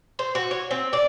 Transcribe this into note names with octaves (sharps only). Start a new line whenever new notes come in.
C5
F#4
C#5
C4
D5